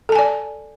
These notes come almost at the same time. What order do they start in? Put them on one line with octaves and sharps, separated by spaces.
A4 A5 G#5 D5